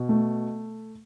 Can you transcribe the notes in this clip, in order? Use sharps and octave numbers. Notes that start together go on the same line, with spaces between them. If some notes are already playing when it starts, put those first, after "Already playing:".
Already playing: B2
A3